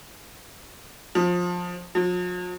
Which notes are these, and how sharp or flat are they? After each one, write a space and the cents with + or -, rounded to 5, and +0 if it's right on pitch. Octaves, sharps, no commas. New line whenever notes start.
F3 +20
F3 +45